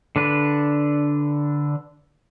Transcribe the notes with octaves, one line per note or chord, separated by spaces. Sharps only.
D3 D4 B4